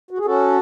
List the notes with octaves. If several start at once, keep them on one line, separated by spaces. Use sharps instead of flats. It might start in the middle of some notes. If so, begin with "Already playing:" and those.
F#4
G#4
C#4 F#4 A4